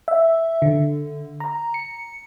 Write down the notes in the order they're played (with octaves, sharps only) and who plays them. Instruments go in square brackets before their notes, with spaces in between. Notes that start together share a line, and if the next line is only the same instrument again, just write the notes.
[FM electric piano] E5
D3
A#5
C#7